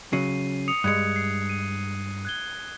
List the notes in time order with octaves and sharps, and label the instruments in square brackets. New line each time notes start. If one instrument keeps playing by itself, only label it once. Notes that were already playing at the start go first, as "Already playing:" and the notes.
[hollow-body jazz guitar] C#3 F#3 [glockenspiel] C7 D#7
[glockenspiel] D#6 C#7 F7
[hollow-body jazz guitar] G2 G#3 [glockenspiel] F#6 G#6 C#7
[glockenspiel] C7
D#7
F#6 G#6 G7